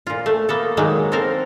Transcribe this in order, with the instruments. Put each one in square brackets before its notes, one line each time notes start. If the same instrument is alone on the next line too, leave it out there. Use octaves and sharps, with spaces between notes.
[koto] A#2 F4
A3
A#3 B3 A4
D#3 F#3 G#3 A#3 D#4
C4 A4 A#4 F5